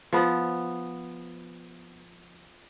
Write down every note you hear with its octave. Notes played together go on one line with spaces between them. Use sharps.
F3 B3